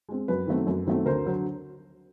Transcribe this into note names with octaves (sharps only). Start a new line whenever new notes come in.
G#3 C4
F#2 B4
D#3 F#3 A3 C4
F#2
D#3 F#3 A3 C4
D2 A#4 C5
D3 F#3